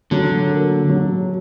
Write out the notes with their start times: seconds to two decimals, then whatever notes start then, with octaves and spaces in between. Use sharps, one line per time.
0.11 D3 F#3
0.51 A#3
0.89 F#3